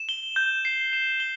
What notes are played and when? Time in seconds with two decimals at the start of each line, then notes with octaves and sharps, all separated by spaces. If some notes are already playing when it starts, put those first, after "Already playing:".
Already playing: E7
0.09 G7
0.36 G6
0.65 C7
0.93 E7
1.20 G7